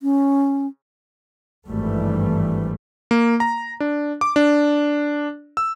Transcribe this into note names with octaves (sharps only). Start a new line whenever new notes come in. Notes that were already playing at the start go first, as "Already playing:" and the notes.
C#4
G#1 G2 E3 G3 A3
A#3
A#5
D4
D6
D4
E6